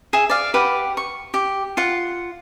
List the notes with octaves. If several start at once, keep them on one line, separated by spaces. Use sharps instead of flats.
G#4 E5
D5 F5
G4 B4 F5 F#5
C#6
G4
F4 F#5